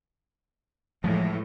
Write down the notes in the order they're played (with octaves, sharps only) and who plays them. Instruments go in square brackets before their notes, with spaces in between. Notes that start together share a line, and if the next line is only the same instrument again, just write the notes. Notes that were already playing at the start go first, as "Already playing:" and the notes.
[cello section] A2 E3 [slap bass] F3 G#3